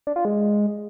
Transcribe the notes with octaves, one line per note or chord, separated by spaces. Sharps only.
D4
F4
G#3